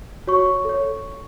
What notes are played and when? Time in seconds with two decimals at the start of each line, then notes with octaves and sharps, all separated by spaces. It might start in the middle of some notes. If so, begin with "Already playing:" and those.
0.27 F#4 C#5 C#6
0.65 A4 C#5